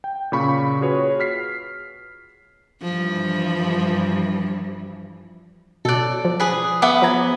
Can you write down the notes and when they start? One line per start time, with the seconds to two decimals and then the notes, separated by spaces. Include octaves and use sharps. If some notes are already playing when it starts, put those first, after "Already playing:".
0.04 G5
0.32 A#2 C#3 B5 C#6
0.81 F4 F#4 G#4 B4 C#5
1.20 F6 B6 C7
2.82 G2 E3 F3
5.85 B2 A4 D5 F#6
6.25 F3
6.40 G#4 B4
6.82 B3 E5 F#5 D6
7.02 F3 A#5 G#6